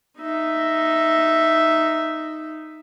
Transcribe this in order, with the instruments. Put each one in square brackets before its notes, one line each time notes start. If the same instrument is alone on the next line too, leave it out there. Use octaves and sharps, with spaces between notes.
[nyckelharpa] D#4 E5